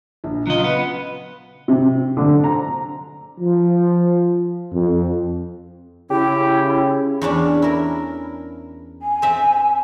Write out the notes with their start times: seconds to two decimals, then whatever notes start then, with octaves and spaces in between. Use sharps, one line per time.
0.24 A#1
0.47 C#3 F#3 F4 D#5
0.64 B3 B4
1.68 C3
2.17 D3
2.44 A#5
3.40 F3
4.73 F2
6.11 C#3 E4 G4
7.22 E2 C#4 D4
7.62 E4 A#4
9.02 G#5
9.22 C4 E5